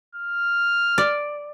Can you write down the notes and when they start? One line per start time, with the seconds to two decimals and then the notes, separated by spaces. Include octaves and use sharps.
0.15 F6
0.98 D5